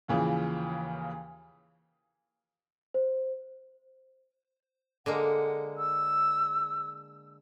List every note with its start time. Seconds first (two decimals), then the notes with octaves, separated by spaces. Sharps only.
0.08 D#2 C#3 E3 F3
2.94 C5
5.06 D3 G#3 A#3 F#5
5.78 E6